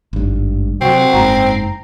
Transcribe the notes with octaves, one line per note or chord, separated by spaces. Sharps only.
G#1 G2
C3 F#3 C4 F#4
F#1 G#2 A#5